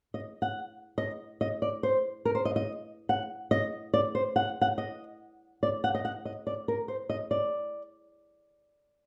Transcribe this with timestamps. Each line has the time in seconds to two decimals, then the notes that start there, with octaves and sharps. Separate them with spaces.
0.14 D#5
0.42 F#5
0.98 D#5
1.41 D#5
1.62 D5
1.83 C5
2.25 A#4
2.35 C5
2.45 D#5
2.56 D#5
3.09 F#5
3.51 D#5
3.94 D5
4.15 C5
4.36 F#5
4.61 F#5
4.78 D#5
5.63 D5
5.84 F#5
5.95 D#5
6.05 F#5
6.25 D#5
6.47 D5
6.68 A#4
6.88 C5
7.10 D#5
7.31 D5